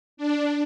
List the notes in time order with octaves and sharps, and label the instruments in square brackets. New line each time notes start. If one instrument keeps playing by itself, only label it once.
[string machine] D4